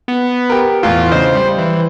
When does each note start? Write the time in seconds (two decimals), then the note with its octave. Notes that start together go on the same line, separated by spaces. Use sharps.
0.08 B3
0.50 G4 A#4
0.83 E2 A2 E3 F4
1.12 C#3 D4 C5 D#5
1.35 G3
1.58 E3